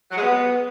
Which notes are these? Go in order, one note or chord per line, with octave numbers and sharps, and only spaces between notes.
F#3
G#3
B3